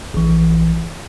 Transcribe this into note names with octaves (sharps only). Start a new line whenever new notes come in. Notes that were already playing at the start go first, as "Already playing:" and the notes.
A#1 E3